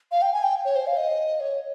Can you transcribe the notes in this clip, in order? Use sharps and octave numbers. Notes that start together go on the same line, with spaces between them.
F5
G5
G#5
G5
C#5
C5
F5
D#5
C#5